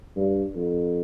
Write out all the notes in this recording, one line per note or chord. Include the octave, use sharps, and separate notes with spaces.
G2
F2